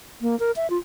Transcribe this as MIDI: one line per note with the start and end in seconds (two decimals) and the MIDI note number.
0.21 0.38 58
0.40 0.51 70
0.56 0.69 76
0.70 0.78 65